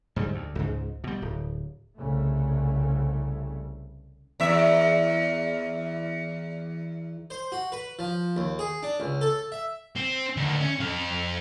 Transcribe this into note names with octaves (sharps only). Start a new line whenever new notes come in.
G#2 D3 G3
D2
C#2 G#2
B2 G3
D1
C2 C#3 A3
E2 E5
C5
F#4
B4
F3
D#2
G#4
D4
C#2
A4
E5
C4
D2 D#3
C#4
F2 F5